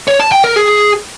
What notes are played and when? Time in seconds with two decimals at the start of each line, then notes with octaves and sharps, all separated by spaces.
0.08 C#5
0.20 A5
0.32 G5
0.44 A#4
0.56 G#4